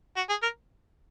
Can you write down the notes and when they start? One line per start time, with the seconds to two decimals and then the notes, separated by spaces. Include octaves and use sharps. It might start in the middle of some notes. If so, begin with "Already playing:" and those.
0.17 F#4
0.29 G#4
0.42 A#4